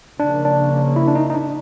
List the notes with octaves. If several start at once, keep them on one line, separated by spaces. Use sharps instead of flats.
C#3 F3 A#3 D4
D4
E4
D4
D#4
D#4
D4